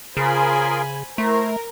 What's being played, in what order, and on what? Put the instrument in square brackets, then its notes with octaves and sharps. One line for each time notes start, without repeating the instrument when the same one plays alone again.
[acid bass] C#3 [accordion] F4 G#4 A#4 [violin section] C5 G#5 B5
[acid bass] A3 [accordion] E4 C5 [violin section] A#4